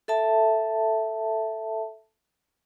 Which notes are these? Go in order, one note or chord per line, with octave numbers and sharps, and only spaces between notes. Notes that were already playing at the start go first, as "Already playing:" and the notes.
A4 E5 A5